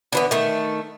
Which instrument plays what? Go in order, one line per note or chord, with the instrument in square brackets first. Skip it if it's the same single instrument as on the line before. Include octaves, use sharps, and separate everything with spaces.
[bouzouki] D3 E3 B3
D#3 A3